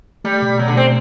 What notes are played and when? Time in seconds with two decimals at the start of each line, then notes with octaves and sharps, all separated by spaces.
0.24 G3 A3
0.42 B2
0.59 B2 F#3
0.68 D3
0.77 A3 C4